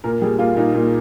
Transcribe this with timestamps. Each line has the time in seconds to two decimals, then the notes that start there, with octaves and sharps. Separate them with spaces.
0.04 A#2 A#4
0.22 G3 G#4
0.39 A#3 F4
0.56 A#2 D#4
0.74 A#2